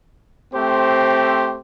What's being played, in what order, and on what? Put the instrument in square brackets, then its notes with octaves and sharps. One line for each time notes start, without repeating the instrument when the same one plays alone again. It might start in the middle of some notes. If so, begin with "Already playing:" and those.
[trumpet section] A3 C4 G4 C5